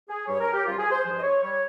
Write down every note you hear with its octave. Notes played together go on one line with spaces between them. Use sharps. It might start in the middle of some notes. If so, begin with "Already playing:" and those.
G#4
G2 G3 C#5
A#4
G4
C#2 C3 G3 F4
G#4
C5
G2 F3 G#3 C5
D#5
C#5
G3 C#5